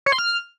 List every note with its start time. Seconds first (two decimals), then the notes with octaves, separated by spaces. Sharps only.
0.06 C#5
0.12 C6
0.18 F6